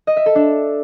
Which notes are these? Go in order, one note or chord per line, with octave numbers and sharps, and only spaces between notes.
D#5
E5
A4
D4